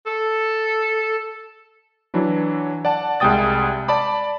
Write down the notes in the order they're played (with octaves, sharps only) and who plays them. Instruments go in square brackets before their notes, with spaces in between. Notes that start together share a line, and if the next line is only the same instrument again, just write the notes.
[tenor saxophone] A4
[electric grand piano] E3 F#3 D4 E4
D5 F#5 A5
C2 G3 G#3 G5 D#6 A6
D5 A5 B5 D6